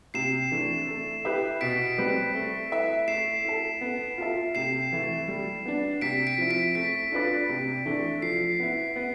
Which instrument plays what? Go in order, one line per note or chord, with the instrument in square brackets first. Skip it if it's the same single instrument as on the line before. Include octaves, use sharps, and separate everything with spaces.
[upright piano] C3 [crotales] C7 E7
[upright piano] E3 A3 D4
A3
E4 G4 B4 E5
[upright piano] B2 [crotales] B6 D7
[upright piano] G3 C4 G4 B4
A3
E4 B4 E5
[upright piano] A3 [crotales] C7 E7
[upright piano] E4 A4
B3
F4 A4 E5
[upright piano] C3 [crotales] C7 E7
[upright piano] E3 A3 E4
G3
B3 D4
[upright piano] C3 [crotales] B6 D7
[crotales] B6 D7
[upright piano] F3 C4 E4
[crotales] B6 D7
[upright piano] A3 [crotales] B6
[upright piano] D4 F4 B4 D5
C3
E3 A3 D4
[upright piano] F3 [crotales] C7
[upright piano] B3 E4
B3